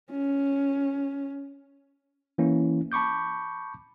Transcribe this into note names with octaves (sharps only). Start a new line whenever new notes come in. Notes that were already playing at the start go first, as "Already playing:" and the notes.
C#4
E3 A#3 C#4 E4
A5 B5 C#6 D6 G6